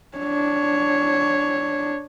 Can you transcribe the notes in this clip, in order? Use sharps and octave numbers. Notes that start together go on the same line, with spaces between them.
D4 C#5